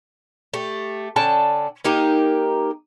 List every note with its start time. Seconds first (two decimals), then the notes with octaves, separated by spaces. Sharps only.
0.54 A3 G4
1.16 D3 C#4 G5 A5
1.84 A#3 D#4 G4 A#4